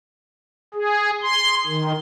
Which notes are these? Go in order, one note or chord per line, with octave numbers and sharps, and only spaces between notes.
G#4
C6
D#3